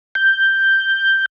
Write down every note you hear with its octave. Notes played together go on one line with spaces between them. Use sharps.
G6